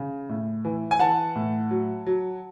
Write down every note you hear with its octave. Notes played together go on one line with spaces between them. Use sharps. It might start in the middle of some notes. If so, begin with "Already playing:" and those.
Already playing: C#3
A2
E3
G#5
E3 F#5 A5
A2
F#3
F#3